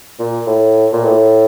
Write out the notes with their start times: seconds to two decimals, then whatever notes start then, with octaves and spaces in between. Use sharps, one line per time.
0.19 A#2
0.47 A2
0.93 A#2
1.04 A2